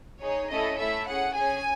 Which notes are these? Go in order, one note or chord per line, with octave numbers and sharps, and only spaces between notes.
D#4 G#4 C#5
A3 C#4 E4 A4 D#5
A3 E4 A4 E5
C#4 G#4 F#5
C#4 G#4 G#5